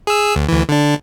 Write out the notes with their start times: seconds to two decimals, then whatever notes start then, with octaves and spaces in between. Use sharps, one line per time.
0.07 G#4 E6
0.36 D2
0.49 D2 E3
0.69 D3 D4